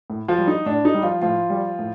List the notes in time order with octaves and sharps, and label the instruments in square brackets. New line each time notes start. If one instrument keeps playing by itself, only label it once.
[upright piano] A2
F3 F4
G3
D#4
A2 D4
D#4
G3
F3 F4
A2 F3 F4
G3
A2